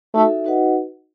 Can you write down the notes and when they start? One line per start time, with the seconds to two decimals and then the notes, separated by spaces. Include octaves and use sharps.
0.15 A3 D#4 F#4 A4 E5
0.44 D#4 F#4 B4 D#5 F#5